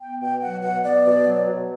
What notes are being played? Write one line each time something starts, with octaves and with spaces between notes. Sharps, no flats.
B3 G5
B2 G5
F#3 F#5
B2 F#5
B3 D5
B2
F#3
B2